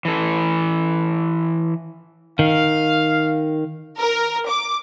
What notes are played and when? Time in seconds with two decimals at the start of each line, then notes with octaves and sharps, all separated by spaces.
0.05 E3 A4
2.39 D#3 F5
3.98 A#4
4.48 D6